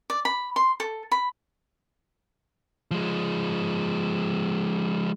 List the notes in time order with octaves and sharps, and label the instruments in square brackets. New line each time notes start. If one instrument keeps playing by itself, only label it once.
[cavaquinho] D5
B5
C6
A4
B5
[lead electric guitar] F3 G#3